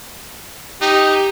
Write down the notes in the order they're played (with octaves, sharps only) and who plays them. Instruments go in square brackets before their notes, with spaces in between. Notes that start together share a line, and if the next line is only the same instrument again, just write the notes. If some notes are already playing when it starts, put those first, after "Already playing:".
[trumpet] D#4 [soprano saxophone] G4